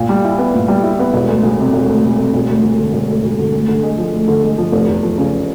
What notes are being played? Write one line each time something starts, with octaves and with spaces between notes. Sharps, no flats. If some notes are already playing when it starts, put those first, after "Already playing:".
Already playing: A#2
G3
E4
B3
A#2
G3
E4
B3
E1
D2
E1
C3
E1
D2
E1
C3
E1
D2
E1
D3
E1
D2
E1
D3
D2
D3
G#3
F3
D2
D3
G#3
F3
F1
E2
F3
C#3